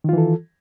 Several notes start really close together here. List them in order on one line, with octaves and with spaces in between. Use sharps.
D#3 F4 E3 A4